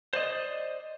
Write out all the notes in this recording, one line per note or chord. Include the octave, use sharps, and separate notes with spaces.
C5 D5 D#5